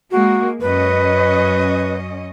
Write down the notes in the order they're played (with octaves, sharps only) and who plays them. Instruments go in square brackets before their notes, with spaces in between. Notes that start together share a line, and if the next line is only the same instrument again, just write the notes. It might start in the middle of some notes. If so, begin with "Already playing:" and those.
[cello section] G#3 A#3 [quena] F#4
[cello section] F#2 C#4 D#5 [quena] B4